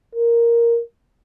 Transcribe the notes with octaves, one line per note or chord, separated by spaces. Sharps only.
A#4